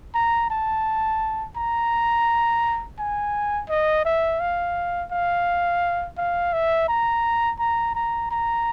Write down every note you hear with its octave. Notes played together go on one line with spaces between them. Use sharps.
A#5
A5
A#5
G#5
D#5
E5
F5
F5
F5
E5
A#5
A#5
A#5
A#5